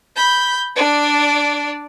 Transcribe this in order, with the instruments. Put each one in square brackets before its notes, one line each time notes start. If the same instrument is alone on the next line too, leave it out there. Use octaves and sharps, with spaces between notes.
[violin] B5 G6
D4 D5